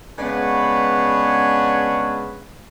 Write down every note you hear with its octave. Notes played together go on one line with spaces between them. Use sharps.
C#3 G#3 B3 D4 B4 C#5